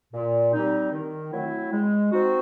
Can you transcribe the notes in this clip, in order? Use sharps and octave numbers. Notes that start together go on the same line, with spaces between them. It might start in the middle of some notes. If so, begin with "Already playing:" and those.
A#2
G3 C4 D#4
D#3
F#3 A3 C4 E4
G#3
C4 D#4 F#4